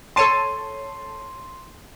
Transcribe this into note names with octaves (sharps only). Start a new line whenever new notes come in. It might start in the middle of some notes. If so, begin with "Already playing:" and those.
A4 C#5 A5 C6 D#7